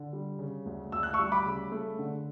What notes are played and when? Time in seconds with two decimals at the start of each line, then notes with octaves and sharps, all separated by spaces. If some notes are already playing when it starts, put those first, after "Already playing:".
Already playing: D3
0.13 G3
0.39 C#3
0.65 D2
0.92 D2 E6
1.03 F#6
1.13 C#6 E6
1.19 G3
1.32 B5 D6
1.45 C#3
1.72 A3
1.99 D3